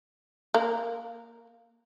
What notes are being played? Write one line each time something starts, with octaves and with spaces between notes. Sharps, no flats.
A#3